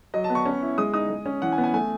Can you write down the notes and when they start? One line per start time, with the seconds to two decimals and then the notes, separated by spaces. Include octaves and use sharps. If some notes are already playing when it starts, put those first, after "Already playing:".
0.14 F#3 D#5
0.24 A5
0.30 B3
0.35 C#6
0.46 C#4
0.62 E4
0.78 G#3 D#6
0.94 D#4 D#6
1.10 G#3
1.26 C#4
1.42 E3 F#5
1.52 G#5
1.58 B3
1.64 G#5
1.74 A3 G#5